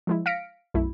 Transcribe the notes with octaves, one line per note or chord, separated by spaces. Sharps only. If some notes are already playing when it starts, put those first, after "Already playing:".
F3 G#3 E4
F5 F6 A#6 B6 C#7 D7
B1 F#2 A3 E4